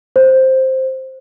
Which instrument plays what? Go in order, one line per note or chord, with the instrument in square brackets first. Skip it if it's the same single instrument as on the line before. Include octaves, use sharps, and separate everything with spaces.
[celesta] C5